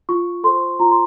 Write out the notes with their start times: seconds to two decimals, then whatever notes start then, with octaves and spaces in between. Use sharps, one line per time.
0.09 F4 C#6
0.44 A4 C5 C6
0.79 F4 A#5
0.91 C6